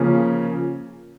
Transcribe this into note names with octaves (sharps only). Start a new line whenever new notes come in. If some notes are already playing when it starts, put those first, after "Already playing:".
Already playing: C#3 F3 A#3 C#4